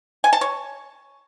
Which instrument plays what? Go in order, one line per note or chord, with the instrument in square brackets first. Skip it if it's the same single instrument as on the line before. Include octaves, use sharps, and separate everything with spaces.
[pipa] G#5
A5
C#5